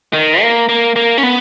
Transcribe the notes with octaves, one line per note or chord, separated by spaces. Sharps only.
D#3
A#3
A#3
A#3
C#4
B3